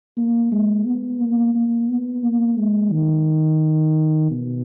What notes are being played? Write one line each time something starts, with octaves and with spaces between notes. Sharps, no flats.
A#3
G#3
B3
A#3
A#3
B3
A#3
G#3
D#3
B2